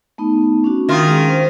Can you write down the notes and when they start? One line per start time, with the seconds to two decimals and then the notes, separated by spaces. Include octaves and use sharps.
0.18 A3 B3 D#4
0.64 C#4 D4 F#4
0.89 D#3 F4 F5 D#6
1.06 G#3 C#4 G#4
1.29 C5